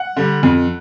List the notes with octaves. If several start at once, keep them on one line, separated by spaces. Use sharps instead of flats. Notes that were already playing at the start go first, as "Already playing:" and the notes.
Already playing: F#5
D3 G3
F2